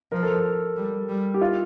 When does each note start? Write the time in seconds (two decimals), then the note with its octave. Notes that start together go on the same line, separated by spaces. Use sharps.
0.12 F3 A#4
0.23 A4
0.34 A#4
0.76 G3
1.09 G3
1.34 G4
1.41 F4